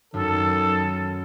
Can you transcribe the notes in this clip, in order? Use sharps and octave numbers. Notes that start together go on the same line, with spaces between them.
F#2 D#3 A4